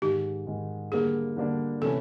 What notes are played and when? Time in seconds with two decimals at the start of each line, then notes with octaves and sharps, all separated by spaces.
0.02 G#2 D#3 G#3 G4
0.47 G#2 D#3 G#3
0.92 D3 G3 A#3 D4 G#4
1.37 D3 G3 A#3 D4
1.82 C3 E3 A3 C#4 A4